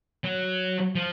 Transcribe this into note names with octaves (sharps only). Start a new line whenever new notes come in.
F#3
F3